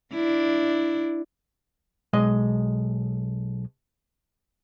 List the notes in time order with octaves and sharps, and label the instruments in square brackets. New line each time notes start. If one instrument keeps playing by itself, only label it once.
[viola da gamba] D4 E4
[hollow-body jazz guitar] B1 G#3 D#5